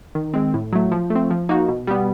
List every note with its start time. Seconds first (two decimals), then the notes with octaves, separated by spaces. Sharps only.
0.15 D#3
0.34 G#3 C4
0.54 A2
0.73 F#3 A3
0.92 F3
1.10 A3
1.15 C4
1.31 F3
1.49 A#3 D#4 F#4
1.68 B2
1.87 G3 B3